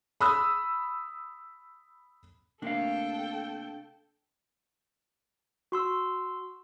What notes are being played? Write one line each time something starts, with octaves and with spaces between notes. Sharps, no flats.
B5 D#6 E6
C3 A3 A#3 D4 A4 F5 G5
F#4 C6 E6